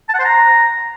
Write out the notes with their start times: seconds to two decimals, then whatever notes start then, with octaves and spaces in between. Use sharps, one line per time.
0.09 A5
0.14 F#5
0.19 C5
0.24 A#5